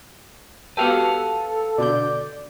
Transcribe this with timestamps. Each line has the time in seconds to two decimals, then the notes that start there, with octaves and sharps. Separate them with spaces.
0.77 B3 F#4 G4 A4 B4 F5 F#5
1.78 B2 D3 D5 G6